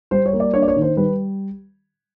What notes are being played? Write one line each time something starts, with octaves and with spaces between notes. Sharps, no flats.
G3 C5
C#5
A#3
D5
D4 C#5
D5
C#5
D#3
C5
G3 B4